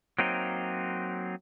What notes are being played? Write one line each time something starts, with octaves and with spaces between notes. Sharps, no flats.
F#3 A#3 C4 D#4